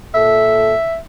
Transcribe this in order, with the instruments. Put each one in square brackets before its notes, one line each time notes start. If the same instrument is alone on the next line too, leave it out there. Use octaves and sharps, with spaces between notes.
[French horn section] A#2 A4 [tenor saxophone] E5